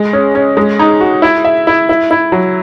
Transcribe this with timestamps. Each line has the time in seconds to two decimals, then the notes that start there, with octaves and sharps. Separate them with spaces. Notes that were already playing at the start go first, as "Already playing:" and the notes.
Already playing: G#3
0.13 C#4
0.35 C#4
0.57 G#3
0.79 D#4
1.01 F#4
1.22 E4
1.45 E5
1.67 E4
1.89 E4
2.11 E4
2.32 F#3